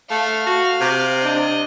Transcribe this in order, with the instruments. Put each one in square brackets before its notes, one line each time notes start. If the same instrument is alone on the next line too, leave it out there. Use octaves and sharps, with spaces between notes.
[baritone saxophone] A3 [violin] F5
[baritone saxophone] F#4
C3
[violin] D4 D#5